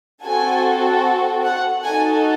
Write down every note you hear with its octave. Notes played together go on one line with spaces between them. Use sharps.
C4 F#4 A4 G#5
F#5
D#4 F#4 A4 G#5